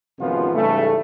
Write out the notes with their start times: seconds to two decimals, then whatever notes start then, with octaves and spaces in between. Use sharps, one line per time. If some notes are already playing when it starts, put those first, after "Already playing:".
0.19 G#1 F#2 C3 F3 B3 F4
0.53 G#2 C#3 E3 G3 A3